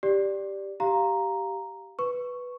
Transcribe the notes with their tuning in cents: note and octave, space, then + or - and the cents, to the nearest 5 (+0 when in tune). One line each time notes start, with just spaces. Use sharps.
G4 +0 D5 +0
G4 -10 F5 +0 A#5 +0
B4 +0 C#6 +0